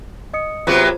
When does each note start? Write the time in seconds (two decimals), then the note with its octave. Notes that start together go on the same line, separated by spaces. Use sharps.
0.34 D#5 D#6 C#7
0.67 C3 F#3 B3 F4 G#4 C5